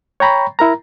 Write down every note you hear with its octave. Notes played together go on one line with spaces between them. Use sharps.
C#5 G5 A#5 B5 C#6
E4 A#4 A#5